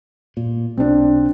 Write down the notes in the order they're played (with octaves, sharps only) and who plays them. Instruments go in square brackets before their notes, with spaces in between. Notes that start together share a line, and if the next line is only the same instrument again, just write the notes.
[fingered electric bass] A#2
[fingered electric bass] B1 [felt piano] C4 D4